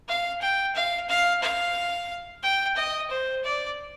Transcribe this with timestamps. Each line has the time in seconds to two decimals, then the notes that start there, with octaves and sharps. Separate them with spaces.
0.09 F5
0.42 G5
0.75 F5
1.09 F5
1.42 F5
2.43 G5
2.76 D#5
3.11 C5
3.44 D5